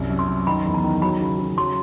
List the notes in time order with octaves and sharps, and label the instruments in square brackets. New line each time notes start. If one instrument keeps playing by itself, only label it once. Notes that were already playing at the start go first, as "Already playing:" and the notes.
Already playing: [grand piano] C2 F#2
F#2
[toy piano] C6
[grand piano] F#2
[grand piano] D#3 [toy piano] B5
[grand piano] E2
[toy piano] A#5
[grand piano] D#3
[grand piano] F#3 [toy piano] B5
[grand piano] C#3
C#3
[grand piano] F#3 [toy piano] C6